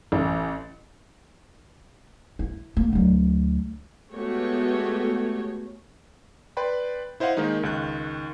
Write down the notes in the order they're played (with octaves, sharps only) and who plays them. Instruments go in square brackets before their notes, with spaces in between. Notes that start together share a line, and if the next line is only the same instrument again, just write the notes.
[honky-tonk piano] A1
[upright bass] E4
A#3
D2 F#3
[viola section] G#3 A3 B3 F#4 G4 C#5
[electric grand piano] B4 D5 G5 B5 C6
E4 C5 D#5 F5 F#5
D#3 G#3 A#3 D#4
C#2 D#3 F#6